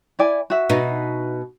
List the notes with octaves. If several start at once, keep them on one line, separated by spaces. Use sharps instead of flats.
E4 D5 G#5
F#4 E5
B2 D#4